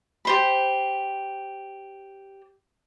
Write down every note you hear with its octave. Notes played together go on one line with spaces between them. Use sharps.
G4 C5 B5